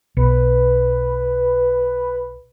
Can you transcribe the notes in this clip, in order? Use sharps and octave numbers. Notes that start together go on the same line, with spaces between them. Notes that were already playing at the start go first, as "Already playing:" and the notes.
B1 B4